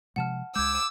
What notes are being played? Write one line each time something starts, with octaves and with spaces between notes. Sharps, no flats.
C3 F3 G#3 F#5 A5 F6
C#2 G#3 D6 E6 G6 G#6